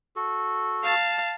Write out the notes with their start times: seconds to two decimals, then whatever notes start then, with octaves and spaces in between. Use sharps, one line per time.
0.16 F#4 A4
0.84 F5 A5